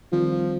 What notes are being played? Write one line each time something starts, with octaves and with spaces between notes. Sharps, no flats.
D#3 F3 G3 C4